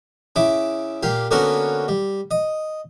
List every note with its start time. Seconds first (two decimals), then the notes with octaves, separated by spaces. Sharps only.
0.36 C#3 E4 D6
1.03 A#2 G4 F5
1.31 D3 A#3 B3 C#4 F#4 A#4
1.88 G3
2.31 D#5